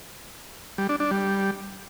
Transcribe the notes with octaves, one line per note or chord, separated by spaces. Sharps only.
G3
D4
D4
G3